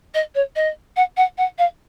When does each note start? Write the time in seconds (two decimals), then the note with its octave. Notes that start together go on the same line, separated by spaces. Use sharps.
0.14 D#5
0.35 C#5
0.56 D#5
0.96 F#5
1.17 F#5
1.38 F#5
1.58 F5